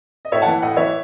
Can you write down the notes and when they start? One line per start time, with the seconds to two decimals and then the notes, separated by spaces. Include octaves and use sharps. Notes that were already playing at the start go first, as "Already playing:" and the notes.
0.25 D#5
0.32 A2 C#5 E5
0.42 E3 F#5 A5
0.62 A2 D#5 F#5
0.76 E3 C#5 E5